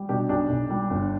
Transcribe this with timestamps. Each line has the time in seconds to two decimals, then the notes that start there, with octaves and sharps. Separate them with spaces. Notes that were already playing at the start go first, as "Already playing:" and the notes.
Already playing: G3
0.09 B2 D4 G4
0.29 B1 D4 G4
0.49 B1
0.70 G3
0.90 G1